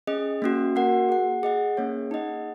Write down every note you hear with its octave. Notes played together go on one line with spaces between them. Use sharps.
C#4 G#4 D#5
A#3 C#4 F#4
A#3 F#4 A#4 F#5
G#4 F#5
G#4 D#5 F#5
A#3 C#4 G#4 C#5
D#4 G#4 D#5 F#5